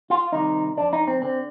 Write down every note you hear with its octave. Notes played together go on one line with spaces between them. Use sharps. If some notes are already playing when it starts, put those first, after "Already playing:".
F4
C2 C3 D#3 D#4
F2 D3 D4
D#4
C4
D3 C4